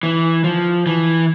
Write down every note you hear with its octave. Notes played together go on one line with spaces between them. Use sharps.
E3
F3
E3